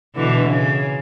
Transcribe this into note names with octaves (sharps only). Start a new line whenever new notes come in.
B2 D3 E3
C#3